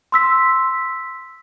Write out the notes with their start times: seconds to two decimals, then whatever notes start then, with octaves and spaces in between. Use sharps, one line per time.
0.12 C6 E6 B6